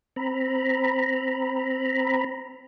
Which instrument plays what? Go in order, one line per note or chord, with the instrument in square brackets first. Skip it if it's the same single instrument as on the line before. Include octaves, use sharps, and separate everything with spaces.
[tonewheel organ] C4 A#5 B5